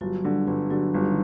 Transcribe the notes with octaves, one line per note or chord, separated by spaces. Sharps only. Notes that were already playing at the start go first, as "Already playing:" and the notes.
G1 F#3 F#4
D3 G3 G4
G1 G3 G4
D3 F#3 F#4
G1
D#3 D#4